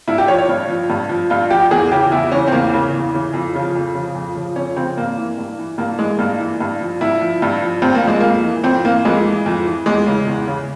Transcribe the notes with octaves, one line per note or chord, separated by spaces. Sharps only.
G2 E4
G4
F3 C#5
C#5
G2
F3
G2
F3
G2 F4
F3 G4
E2 G#4
C#3 E3 G4
E2 E4
C#3 E3 C#4
C4
E2 A#3
C#3 E3
E2
C#3 E3
F2
C#3 F3
F2
C#3 F3
F2
C#3 F3
F2 C#4
C#3 F3 C4
G2 A#3
E3
G2
E3
G2 A#3
E3 G#3
G2 A#3
E3
G2
F3
G2 E4
F3
G2
F3
G2 C4
A#3
F3 G#3
F2 A#3
E3
F2 C4
E3 A#3
F2 G#3
E3
F2
E3
E2 G#3
C#3 E3
E2
C#3 E3